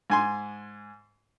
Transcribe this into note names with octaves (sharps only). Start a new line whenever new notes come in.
G#2 G#5 C6